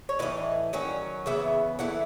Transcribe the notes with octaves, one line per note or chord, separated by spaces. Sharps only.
C#5
A2 E3 B3 E4 D#5
D#3 F#3 C#4
C#3 E3 B3 E5
E3 A3 E4 F#5